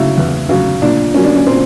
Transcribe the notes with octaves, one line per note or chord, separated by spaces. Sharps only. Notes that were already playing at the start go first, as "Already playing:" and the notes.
Already playing: C#3 F#3 E4
E2
C#3 F#3
A#2 D4
F#3 A#3 C#4
D4
C#4
A#2 C4